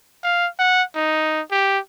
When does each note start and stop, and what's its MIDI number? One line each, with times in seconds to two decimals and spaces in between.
0.23 0.47 77
0.59 0.82 78
0.95 1.41 63
1.51 1.79 67